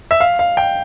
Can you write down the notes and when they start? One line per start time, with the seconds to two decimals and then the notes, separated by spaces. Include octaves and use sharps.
0.11 E5
0.20 F5
0.39 F5
0.57 G5